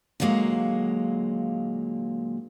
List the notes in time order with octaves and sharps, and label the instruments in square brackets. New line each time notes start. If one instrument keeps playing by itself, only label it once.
[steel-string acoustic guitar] A#2 D3 F#3 G#3 A#3